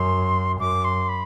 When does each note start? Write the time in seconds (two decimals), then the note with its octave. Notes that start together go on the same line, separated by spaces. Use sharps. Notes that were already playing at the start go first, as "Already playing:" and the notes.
Already playing: F#2 C6
0.59 F#2 D6
0.84 C6
1.09 B5